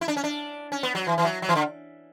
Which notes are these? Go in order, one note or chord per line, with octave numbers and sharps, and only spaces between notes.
E4
D4
C#4
D4
C#4
B3
F#3
E3
E3
F#3
F#3
E3
D3